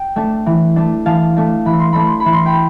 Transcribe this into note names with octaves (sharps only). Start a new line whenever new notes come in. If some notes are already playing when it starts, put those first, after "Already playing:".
Already playing: G5
A3 D4
E3
A3 D4
E3 F5 A5
A3 D4
E3 B5
C6
A3 D4 B5
C6
B5
E3
C6
G5 B5